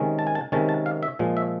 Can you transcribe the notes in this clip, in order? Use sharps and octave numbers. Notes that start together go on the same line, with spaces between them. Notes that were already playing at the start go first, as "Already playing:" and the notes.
Already playing: C3 D#3 G#3 C#4
A5
G#5
A5
C3 D#3 G#3 C#4 A5
A5
F5
E5
A#2 F3 G#3
E5